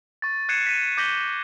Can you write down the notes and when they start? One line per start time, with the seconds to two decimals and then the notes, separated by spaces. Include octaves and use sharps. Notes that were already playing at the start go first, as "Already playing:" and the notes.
0.22 C#6 A6
0.49 F#6 G#6 C7 C#7 D#7 E7
0.66 B6 D#7
0.97 D6 G6 A#6 B6 F#7 G7